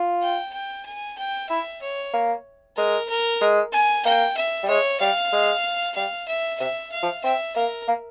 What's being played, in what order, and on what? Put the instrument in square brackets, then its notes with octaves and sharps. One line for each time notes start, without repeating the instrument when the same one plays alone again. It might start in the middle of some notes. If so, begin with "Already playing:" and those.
Already playing: [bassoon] F4
[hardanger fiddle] G5
G5
G#5
G5
[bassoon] E4 [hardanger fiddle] E5
[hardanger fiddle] C#5
[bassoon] A#3
[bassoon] G#3 [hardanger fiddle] A#4
[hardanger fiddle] A#4
[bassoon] G#3
[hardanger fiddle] G#5
[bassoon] A#3 [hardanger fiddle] G5
[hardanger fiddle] E5
[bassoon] G3
[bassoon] G#3 [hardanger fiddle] C#5
[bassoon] G3 [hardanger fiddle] F5
[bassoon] G#3
[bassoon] G3 [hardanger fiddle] F5
[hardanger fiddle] E5
[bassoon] C3 [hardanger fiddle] E5
[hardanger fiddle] F5
[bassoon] F3
[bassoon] C4 [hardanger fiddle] E5
[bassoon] A#3 [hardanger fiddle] A#4
[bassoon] A#3